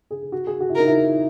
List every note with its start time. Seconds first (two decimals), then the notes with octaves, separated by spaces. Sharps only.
0.11 G#4
0.32 F#4
0.47 G#4
0.60 F#4
0.69 E4
0.75 D#4 A#4
0.87 E4